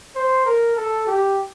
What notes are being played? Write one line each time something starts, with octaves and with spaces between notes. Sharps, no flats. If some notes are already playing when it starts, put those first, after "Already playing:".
C5
A#4
A4
G4